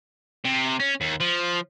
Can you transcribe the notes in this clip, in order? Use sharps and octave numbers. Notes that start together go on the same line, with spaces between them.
C3
C#4
D#2
F3